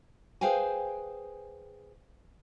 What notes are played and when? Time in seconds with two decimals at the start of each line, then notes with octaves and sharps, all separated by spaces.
0.41 G#4 B4 C5 F5 G5 G#5